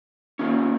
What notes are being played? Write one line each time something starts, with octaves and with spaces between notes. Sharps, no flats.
D#3 A#3 C#4